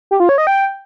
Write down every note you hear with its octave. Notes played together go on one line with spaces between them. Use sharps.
G4
F4
C#5
D#5
G5